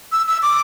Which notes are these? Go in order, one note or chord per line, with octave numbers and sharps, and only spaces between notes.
E6
E6
D6